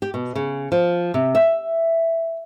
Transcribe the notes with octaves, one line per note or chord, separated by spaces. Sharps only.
G4
B2
C#3
F3
C3
E5